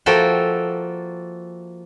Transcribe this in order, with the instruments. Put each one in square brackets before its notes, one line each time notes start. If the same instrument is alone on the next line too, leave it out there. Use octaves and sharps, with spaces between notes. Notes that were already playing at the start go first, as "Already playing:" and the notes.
[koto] F3 A#3 F#4 A4 E5 G5